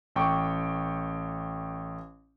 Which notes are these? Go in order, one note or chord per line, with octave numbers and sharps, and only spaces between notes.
A1 G5 C#6 D6